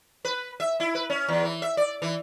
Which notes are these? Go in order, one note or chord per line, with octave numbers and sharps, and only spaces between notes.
B4
E5
E4
B4
C#4
E2
E3
E5
D5
E3